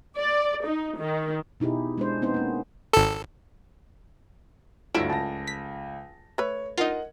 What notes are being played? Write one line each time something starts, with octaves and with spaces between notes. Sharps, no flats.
D5
D#4
D#3
B2 D#4 E4 G4 G#4
G#3 D4 C5
B3 C4 D#4 C5
A#3 C#4
G#1 A4
D2 G2 F3 F#3 A3 E4 A#6 D7
C#2 A5 A#6
B6
A3 B4 C#5
D#4 F4 A#4 D#5 F#5